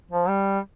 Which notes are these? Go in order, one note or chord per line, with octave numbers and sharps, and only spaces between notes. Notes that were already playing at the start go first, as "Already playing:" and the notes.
F3
G3